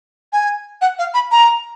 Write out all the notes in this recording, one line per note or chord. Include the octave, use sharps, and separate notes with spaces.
G#5
F#5
F5
B5
A#5